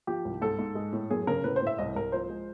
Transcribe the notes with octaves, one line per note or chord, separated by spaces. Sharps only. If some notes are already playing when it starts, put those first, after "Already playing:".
F3 G4
C2
G#2 A4
G#2
G#3
A2
F#2 G#4
C#3 A#4
A2 B4
C5
A2 E5
C2 D#5
C2 A#4
F3 C5
G#3